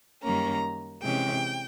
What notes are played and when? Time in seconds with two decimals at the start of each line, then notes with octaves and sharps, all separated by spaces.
0.21 F#2 D#3 G3 A#3 C#4 A#5
1.01 C3 E3 G#3 C#4 G5